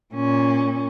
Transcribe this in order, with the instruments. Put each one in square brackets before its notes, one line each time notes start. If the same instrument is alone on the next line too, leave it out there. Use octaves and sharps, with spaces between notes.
[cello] A#2 C#4